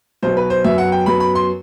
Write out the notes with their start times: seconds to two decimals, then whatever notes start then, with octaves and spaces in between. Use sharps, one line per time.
0.23 B1 B2 F#3 C5
0.37 B4
0.50 C5
0.64 F#2 F#3 B3 E5
0.78 F#5
0.92 G5
1.06 F#2 F#3 B3 B5
1.20 B5
1.35 C6